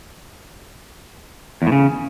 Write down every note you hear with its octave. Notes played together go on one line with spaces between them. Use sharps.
E2
A2
C#3